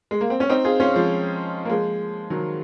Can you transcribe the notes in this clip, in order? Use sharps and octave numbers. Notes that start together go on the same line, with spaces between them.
G#3
A#3
C4
C#4
C4 D#4
F4 G#4
C#4 F4
F3 G#3
A#3
F3 G#3
D#3 F#3